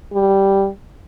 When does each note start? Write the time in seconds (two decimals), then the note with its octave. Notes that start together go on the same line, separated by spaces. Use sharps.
0.13 G3